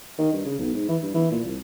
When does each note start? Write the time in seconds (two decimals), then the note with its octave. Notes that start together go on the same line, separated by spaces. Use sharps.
0.18 D#3
0.33 G2
0.45 C#3
0.58 B1
0.73 G#2
0.88 E3
1.02 G2
1.14 E3
1.31 A#2
1.44 C2